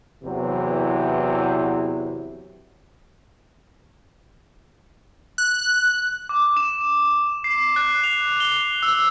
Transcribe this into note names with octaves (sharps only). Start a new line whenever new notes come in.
E2 C3 E3 F#3
F#6
D6
E7
C7
F#6
F7
G7
E6